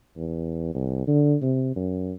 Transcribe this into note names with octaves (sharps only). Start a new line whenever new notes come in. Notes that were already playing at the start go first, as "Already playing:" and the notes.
E2
C2
D3
C3
F#2